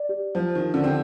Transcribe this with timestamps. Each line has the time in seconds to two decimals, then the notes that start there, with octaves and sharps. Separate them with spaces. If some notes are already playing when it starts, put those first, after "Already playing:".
Already playing: D5
0.09 G4
0.35 F3 C5
0.55 D#3
0.61 D#4
0.74 D3
0.84 C4 G4